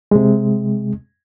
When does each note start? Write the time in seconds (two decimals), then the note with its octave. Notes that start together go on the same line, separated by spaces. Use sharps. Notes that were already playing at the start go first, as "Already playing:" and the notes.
0.11 C3 G#3